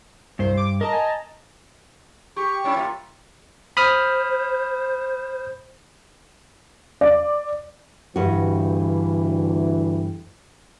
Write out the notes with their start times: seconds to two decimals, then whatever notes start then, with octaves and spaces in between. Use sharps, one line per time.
0.39 C2 G2 C5
0.57 D6
0.81 A#4 D#5 A5 A#5
0.93 G#5
2.36 G4 C#6
2.64 G3 C#4 E4
2.76 A#3 F4
3.77 C5 B5 D#6 F6
7.01 D5
8.16 D2 G2 E3 F#4